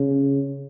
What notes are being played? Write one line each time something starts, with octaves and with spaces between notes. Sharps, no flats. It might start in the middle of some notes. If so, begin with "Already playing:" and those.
Already playing: C#3